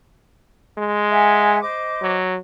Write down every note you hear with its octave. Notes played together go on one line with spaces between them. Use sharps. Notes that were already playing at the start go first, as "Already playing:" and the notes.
G#3
E5 F#5 G#5
C5 D#5 D6
F#3